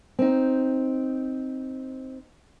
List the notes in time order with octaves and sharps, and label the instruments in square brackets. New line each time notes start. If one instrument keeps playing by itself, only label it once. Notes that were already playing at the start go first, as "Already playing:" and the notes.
[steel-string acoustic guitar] C4 D#4